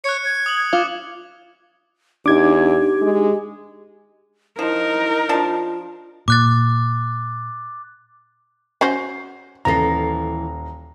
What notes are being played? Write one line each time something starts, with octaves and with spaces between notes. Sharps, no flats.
C#5 F#6 C#7
G#6
D#6 F#7
F4 D6
E2 D4 D#4 G4 D6 G#6
G#3
F3 D#4 E4 A#4
F3 D4 F4 A5
A#2 D6 F#6 A6
C#4 F#4 C5 C7
D#1 E3 A4 A#5 A#6 C7